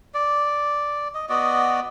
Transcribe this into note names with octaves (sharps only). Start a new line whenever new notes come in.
D5
D#5
B3 F#4 D5 D#5